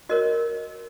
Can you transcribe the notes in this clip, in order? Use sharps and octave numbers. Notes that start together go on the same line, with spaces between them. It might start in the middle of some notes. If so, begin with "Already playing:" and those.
F#4 A#4 C#5 D#5